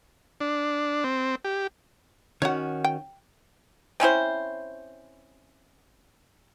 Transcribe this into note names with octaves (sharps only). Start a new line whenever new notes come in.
D4
C4
G4
D#3 C#4 F#4 C#5 F#5
G5
C4 C#4 E4 C5